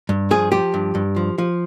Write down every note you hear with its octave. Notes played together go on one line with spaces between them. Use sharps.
G2
F3 G#4
F3 G4
G2
G2
F3
F3